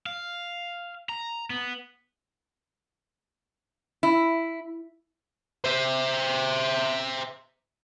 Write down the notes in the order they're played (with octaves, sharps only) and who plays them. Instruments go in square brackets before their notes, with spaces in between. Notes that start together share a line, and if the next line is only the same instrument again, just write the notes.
[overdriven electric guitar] F5
A#5
B3
[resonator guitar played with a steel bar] E4
[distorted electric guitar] C5 E5